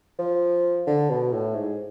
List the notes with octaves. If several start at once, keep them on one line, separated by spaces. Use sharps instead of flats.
F3
D3
B2
A2
G#2